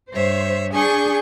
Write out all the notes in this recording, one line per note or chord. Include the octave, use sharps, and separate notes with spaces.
G2 C5 C#5 E5
D4 G#4 G#5 C#6 G6